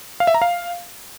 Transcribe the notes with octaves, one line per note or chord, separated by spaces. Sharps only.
F5
E5
A#5
F5